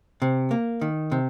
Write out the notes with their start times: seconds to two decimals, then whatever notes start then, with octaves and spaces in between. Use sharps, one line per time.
0.22 C3
0.51 A#3
0.82 D#3
1.12 C3